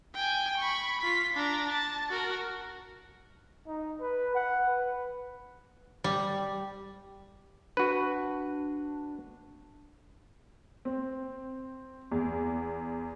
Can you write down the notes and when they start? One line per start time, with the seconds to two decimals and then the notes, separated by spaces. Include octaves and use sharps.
0.14 G5 G#5
0.57 B5 C#6
1.01 F4 B6
1.34 D4 A#5
1.69 A5
2.10 F#4 A#4
3.67 D#4
4.00 B4
4.35 F#5
4.68 B4
6.04 G3
7.77 D4 F#4 B4
10.85 C4
12.11 E2